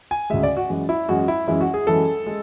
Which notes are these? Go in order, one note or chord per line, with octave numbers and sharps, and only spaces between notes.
G#5
D2 C#3 G#3 E5
D5
F#4
F#2 E3 G#3
E4
F#2 E3 G#3 F#4
E4
F#2 E3 G#3 E4
F#4
G#4
F#2 E3 G#3 A4
G#3